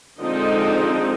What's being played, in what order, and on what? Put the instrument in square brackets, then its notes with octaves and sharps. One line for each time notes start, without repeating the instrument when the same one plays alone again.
[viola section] D3 F3 G#3 C4 D#4 D#5